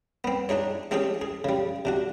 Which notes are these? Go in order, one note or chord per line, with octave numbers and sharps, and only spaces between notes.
B3 C4
D4 D#4 G#4 C#5
G#3 C4 C#4 G4 G#4
G#4
C#3 G3
C3 D4 F#4